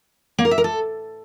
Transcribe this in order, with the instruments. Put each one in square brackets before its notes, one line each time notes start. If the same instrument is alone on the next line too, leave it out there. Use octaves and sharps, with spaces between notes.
[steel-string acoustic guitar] A#3
A#4
E5
A#4
A4